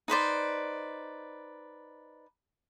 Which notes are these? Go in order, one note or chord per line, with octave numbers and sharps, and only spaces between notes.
D#4 B4 C5 D5